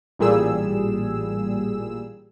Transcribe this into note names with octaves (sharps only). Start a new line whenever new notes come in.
A1 A#2 G3 G#4 E6